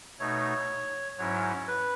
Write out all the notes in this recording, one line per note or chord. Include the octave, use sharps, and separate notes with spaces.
B2 A3 D#4 C#5
G#2 F#3 C#4 E4 C#5
B4